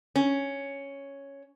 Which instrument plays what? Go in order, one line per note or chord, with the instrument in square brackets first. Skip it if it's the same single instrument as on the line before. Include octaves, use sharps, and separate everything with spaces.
[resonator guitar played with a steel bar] C#4